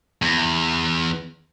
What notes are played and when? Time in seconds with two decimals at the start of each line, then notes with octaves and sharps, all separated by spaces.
0.22 E2